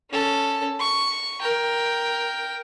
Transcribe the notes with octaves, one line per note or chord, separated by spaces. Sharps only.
C#4 A4
C#6
A#4 G5